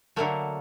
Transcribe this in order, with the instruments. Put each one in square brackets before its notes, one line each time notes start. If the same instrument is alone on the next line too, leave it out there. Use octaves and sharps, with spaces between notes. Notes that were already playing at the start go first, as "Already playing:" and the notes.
[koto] D3 F#3 A3 A#3